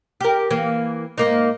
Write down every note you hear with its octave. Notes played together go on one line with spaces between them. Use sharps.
G4 A#4
E3 A#3
G#2 A#3 D#4